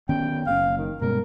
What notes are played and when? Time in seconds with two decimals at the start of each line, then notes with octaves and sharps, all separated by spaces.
0.09 D#3 B3 C#4 G5
0.47 F#1 C3 C#4 F5
0.77 D#3
1.01 G2 B2 G#3 A#4